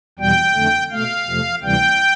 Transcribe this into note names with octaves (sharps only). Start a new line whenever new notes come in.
E2 B2 G3 G5
F2 D3 A3
B2 A3 F5
F2 C3 F3 A3
D2 C3 E3 G3 G5